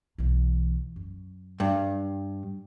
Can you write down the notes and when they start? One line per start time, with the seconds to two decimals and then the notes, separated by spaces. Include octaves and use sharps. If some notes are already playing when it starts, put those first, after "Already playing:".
0.18 B1 E3
0.96 F#2
1.60 G2